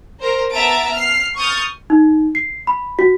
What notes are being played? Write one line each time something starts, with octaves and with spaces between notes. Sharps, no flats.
A#4 C5
B3 E5 A5 A#5 A6 D7
F6 C7
C#6 D#6 F6 G6 A6
D#4
C7
B5
F#4